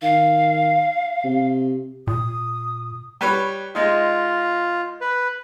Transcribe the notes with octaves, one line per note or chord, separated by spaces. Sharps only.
D#3 F5
C3
A#2 D#6
G3 B4 C#5
G#3 D#4 F4
B4